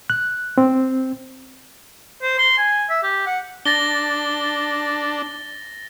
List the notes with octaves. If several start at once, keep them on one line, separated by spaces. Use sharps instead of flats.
F#6
C4
C5
C6
G#5
E5
G4
F#5
D4 A6 A#6 G7